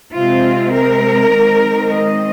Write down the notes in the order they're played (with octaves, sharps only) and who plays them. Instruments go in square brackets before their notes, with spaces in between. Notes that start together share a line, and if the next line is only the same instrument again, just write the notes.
[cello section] C3 G#3 C4 F4
A#4
D#3 G#3 C4
D#5